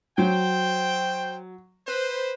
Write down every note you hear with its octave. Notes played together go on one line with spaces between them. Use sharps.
F#3 C5 G5
B4 C5